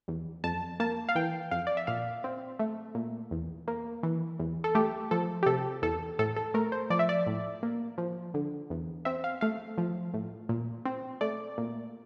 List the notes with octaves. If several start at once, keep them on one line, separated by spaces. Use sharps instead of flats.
E2
F2 A5
A#3 A5
F5
E3 G5
F2 F5
D5
E5
A#2 F5
C4
A3
A#2
E2
A#3
E3
E2
A4
A3 G4
F3 A4
G4
C3 A4
E2 A4
A2 A4
A4
A3 A#4
C5
F3 D5
E5
D5
A2
A#3
F3
D3
E2
C4 E5
F5
A3 F5
F3
A2
A#2
C4
A3 D5
A#2